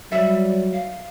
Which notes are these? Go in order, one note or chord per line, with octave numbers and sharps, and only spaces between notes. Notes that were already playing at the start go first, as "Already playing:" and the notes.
F#3 G3 E5
F5